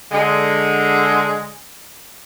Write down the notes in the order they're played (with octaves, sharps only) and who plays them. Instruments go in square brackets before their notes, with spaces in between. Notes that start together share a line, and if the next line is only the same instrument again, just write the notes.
[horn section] D3 G#3